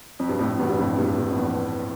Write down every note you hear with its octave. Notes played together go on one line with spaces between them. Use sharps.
F2
G2
F2 A2
E2 G2
G2
F2 A2
G2 A#2
G2 A#2
F2
E2